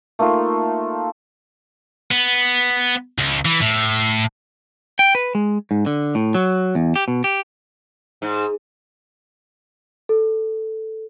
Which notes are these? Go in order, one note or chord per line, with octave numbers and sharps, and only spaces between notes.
A3 A#3 D#4 F4
B3
C#2
E3
A2
G5
B4
G#3
G#2
D3
A2
F#3
E2
G4
B2
G4
G#2
A4